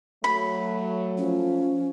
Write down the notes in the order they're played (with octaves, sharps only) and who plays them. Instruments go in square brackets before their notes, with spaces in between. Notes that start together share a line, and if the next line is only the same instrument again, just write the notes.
[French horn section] F#3 A3 [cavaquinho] B5
[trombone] F3 [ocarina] C#4